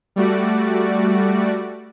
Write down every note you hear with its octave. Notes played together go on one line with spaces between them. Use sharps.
G3 A3 F#4 D5